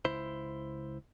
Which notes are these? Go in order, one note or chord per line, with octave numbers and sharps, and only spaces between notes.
C#2 E4 C5